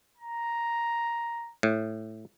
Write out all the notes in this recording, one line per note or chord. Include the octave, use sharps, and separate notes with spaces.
A#5
A2